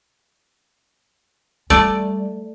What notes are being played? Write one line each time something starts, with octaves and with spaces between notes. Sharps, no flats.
G3 A3 D5